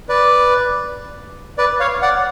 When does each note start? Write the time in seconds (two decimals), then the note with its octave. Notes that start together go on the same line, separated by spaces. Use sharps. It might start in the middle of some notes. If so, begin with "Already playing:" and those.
0.09 B4 D5
1.58 B4 D5
1.80 C#5 F5
2.02 D5 F#5